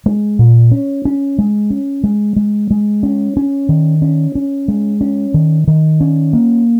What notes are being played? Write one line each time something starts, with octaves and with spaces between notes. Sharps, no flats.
G#3
A#2
C#4
C#4
G#3
C#4
G#3
G#3
G#3
C#4
C#4
D#3
C#4
C#4
G#3
C#4
D#3
D#3
C#4
A#3